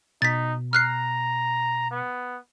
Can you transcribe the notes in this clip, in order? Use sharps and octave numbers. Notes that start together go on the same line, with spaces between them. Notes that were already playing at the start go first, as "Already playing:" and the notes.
B2 D#4 A6 B6
A#5 F6 F#6 C7
B3